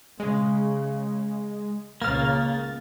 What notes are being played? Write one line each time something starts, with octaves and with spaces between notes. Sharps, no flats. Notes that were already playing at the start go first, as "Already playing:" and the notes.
C#3 G#3
C#2 C#3 A#3 F6 A6